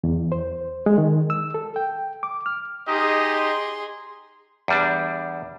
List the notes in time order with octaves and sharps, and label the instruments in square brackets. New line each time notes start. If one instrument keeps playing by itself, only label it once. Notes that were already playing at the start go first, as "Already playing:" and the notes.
[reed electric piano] E2
C5
G#3
D#3
E6
A4
G5
D6
F6
[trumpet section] D#4 G4 D#5 [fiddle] G#4 C6
[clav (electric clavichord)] E2 G3 D4